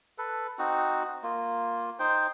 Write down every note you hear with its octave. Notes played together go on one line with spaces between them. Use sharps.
A4 B4
C4 D#4 F#4
A#3 F4
D#4 C5 G5